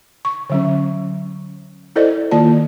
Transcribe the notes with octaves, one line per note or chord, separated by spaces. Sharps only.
C#6
D3 F#3 C#4
E4 A4 C5 D5 D#5
D#3 A#3 F4 D5 A5